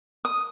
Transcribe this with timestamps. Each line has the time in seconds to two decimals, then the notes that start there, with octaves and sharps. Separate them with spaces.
0.25 D#6